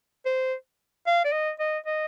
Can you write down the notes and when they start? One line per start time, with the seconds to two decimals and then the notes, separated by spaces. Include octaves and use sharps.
0.26 C5
1.07 F5
1.25 D5
1.32 D#5
1.60 D#5
1.86 D#5